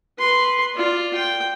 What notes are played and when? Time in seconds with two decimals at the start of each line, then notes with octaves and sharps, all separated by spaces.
0.19 B4 C6
0.74 F4 D5
1.15 G5